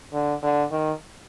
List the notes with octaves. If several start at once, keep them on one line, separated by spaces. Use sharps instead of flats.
D3
D3
D#3